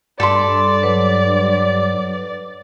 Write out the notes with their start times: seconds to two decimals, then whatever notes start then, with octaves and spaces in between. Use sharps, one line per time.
0.20 G2 A4 D5 B5 C6
0.83 F#3 B4 C#5